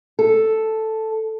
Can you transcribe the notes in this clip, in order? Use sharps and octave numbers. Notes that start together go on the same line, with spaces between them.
A4